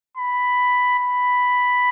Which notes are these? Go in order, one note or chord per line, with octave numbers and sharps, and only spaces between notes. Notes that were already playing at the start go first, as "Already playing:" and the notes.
B5
B5